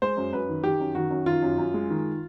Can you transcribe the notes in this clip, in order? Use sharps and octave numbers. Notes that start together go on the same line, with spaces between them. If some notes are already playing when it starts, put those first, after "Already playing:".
G#3 C5
F#2
F#2 B4
D#3
D#3 G4
F#2
D#3 F#4
F#2
D#3 F4
F#2
F#2
G#3
D#3